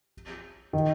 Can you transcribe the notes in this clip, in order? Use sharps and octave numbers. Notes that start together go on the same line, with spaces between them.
D#3